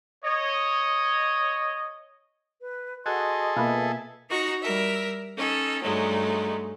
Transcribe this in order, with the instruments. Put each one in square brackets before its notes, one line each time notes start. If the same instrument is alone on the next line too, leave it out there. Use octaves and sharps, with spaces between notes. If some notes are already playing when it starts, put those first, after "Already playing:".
[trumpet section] C#5 D#5
[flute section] B4
[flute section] F#4 D#5 C6 [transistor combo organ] G#4 A4 [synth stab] F#5
[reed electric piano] B2 A#3 [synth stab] F4 B4 D#5 [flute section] E5
[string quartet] D#4 F#4 A#5 C#6
G3 A#4 E5
C#4 D#4 A4
G2 F#3 G#3 A3 D#4